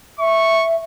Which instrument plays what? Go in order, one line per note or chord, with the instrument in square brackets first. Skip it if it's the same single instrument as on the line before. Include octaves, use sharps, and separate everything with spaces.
[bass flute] E5 [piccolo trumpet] C#6